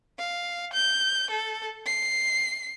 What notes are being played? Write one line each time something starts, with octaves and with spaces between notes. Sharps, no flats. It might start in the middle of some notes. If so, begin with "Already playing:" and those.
F5
G6
A4
C7